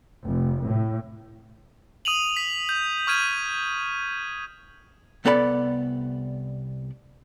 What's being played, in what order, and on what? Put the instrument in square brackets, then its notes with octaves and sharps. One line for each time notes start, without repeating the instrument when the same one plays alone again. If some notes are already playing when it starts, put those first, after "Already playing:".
[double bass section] F1
A2
[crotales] D#6 D#7 F7 F#7
B6
G6
C#6 F6 G#6 D#7
[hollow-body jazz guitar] C2 B3 A4 D5 G#5 B5